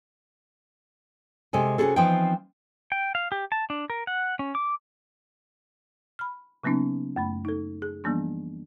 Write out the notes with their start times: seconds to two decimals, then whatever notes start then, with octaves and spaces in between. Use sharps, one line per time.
1.53 C3 G#3 A4 G#5
1.78 C3 C#4 F4 F#4 G#4 A4
1.96 E3 F3 B3 C4 D#4 G5
2.92 G5
3.15 F5
3.32 G4
3.52 A5
3.70 D4
3.90 A#4
4.07 F#5
4.39 C#4
4.55 D6
6.19 B5 F6
6.64 C#3 F#3 A#3 B3 C#4 D#4
7.16 F#2 A3 B5
7.45 D#4 A4
7.82 G#4
8.04 E3 F3 G3 A#3 B3 D4